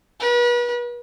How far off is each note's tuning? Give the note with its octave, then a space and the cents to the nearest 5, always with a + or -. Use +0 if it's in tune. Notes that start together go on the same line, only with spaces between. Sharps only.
B4 -40